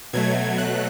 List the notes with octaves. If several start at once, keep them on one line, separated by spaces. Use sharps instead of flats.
B2 F#3 A3 G#6
F#6